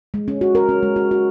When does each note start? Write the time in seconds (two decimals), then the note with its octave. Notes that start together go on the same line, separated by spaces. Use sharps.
0.14 G#3
0.28 C#4
0.41 F#4
0.55 A#4
0.69 C#4
0.83 G#3
0.96 F#4
1.11 F#4